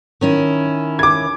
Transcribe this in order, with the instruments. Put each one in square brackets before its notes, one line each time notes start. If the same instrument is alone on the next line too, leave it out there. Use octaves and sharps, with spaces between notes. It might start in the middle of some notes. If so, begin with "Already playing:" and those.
[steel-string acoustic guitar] D#3 C#4 E4
[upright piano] D6 G#6